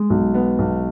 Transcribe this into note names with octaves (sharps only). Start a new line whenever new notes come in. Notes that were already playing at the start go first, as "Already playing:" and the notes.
Already playing: G#3
B1
B3
B1